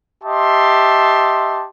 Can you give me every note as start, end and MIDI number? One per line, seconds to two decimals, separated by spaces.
0.23 1.66 67
0.23 1.66 75
0.23 1.66 76
0.23 1.66 81
0.23 1.66 84